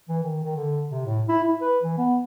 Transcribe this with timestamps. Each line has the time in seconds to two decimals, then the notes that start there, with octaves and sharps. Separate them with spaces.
0.09 E3
0.23 D#3
0.44 D#3
0.56 D3
0.91 C3
1.05 A2
1.29 E4
1.44 E4
1.61 B4
1.83 E3
1.98 B3